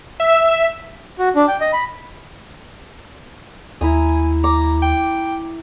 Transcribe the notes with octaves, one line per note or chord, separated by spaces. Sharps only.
E5
F#4
D4
G5
D#5
B5
D#2 E4 G#5 A#5 D#6
A#5 D6
G5